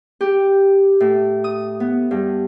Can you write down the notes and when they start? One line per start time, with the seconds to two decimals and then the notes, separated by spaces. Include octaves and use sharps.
0.21 G4
1.01 A2
1.44 D#6
1.80 B3
2.11 G2